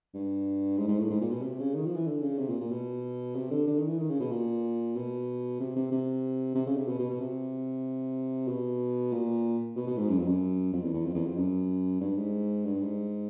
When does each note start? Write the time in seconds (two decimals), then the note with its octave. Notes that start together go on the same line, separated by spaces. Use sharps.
0.14 G2
0.78 G#2
0.88 G#2
0.99 A2
1.10 G#2
1.21 A#2
1.32 B2
1.42 C3
1.59 C#3
1.75 D#3
1.86 F3
1.96 E3
2.06 D3
2.22 C#3
2.38 C3
2.49 A#2
2.60 A#2
2.71 B2
3.35 C3
3.51 D3
3.67 D3
3.78 D#3
3.88 E3
3.99 D#3
4.10 C#3
4.20 B2
4.31 A#2
4.96 B2
5.60 C3
5.76 C3
5.91 C3
6.55 C3
6.66 C#3
6.77 C3
6.88 B2
6.99 B2
7.10 B2
7.20 C3
8.48 B2
9.12 A#2
9.76 B2
9.87 B2
9.98 G#2
10.09 F#2
10.18 F2
10.27 F#2
10.73 F2
10.84 E2
10.94 E2
11.05 F2
11.15 E2
11.26 F2
11.37 F#2
12.01 G2
12.16 G#2
12.64 G2
12.81 G#2